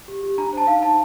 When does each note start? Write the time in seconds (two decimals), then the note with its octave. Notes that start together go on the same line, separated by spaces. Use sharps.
0.08 G4
0.23 G4
0.38 D4 A#5
0.53 C5 A5
0.67 D#4 F5
0.83 D#4 A5